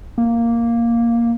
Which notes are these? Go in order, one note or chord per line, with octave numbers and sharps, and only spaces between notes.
A#3